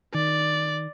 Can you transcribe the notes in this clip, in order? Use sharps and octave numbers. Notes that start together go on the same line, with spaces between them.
D#3 D5